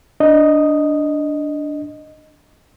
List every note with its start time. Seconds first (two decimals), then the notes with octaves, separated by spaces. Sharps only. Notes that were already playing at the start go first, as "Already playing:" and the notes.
0.20 D4 D#5